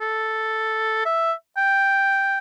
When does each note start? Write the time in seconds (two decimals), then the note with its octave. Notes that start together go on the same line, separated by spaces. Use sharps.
0.01 A4
1.06 E5
1.57 G5